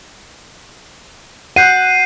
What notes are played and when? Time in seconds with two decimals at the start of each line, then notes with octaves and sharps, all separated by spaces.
1.56 F#5 G6 C7 D#7